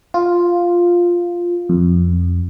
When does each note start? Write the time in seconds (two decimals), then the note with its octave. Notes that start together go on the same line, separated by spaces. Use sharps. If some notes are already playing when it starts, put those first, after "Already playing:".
0.14 F4
1.69 F2